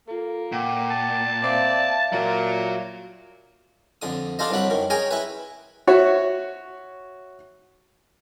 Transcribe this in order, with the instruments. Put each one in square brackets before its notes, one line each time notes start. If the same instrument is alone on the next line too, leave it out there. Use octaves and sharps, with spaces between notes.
[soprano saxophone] A#3 [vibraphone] F4 A4
[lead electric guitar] A#2 [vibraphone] F#5 G5 D6
[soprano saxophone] A5
[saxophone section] C4 D5 [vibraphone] E5 F5
[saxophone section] A#2 [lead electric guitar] F#3 F#4 [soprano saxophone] A#4
[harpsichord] F2 D3 D#6
D4 F4 A4 C5 D#5
C2 G2 F#3 F#5 B5
F#2 D#3
C#4 G#4 G5 G#5 A#5 D#6
E4 B4
[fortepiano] F#4 C#5 E5